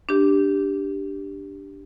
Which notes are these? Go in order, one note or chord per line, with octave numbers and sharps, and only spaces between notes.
D4 G4